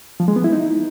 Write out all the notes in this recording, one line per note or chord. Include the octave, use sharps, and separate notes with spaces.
F3
G#3
B3
E4
D#4